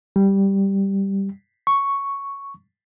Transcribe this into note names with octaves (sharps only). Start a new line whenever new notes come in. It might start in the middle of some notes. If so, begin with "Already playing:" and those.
G3
C#6